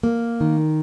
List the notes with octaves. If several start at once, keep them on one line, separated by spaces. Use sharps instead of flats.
A#3
D#3